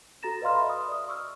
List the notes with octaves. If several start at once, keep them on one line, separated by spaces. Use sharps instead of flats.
F#4 A4 A#5 A6 A#6 E7
B4 D5 D#5 F5 C6 F6
E5 B5
D#6
D5 D#6
C#6 E6 F6